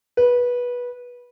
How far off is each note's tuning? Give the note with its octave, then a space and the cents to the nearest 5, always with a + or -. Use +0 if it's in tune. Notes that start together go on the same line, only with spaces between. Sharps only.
B4 -20